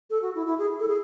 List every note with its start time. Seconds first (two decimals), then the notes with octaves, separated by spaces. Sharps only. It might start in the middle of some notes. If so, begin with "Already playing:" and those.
0.10 A4
0.22 F#4
0.35 E4
0.46 E4
0.58 G#4
0.80 A4
0.88 G#4